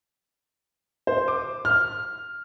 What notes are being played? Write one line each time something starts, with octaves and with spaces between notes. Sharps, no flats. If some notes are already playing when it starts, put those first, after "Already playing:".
C5
D6
F6